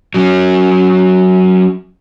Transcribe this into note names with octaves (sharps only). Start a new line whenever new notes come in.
F#3 C#4